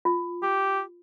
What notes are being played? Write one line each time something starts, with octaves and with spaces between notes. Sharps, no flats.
F4
G4